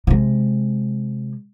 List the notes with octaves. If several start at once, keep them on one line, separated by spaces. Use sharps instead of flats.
C3 G#3